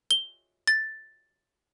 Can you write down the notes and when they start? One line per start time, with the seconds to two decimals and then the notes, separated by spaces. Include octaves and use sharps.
0.11 G7
0.67 A6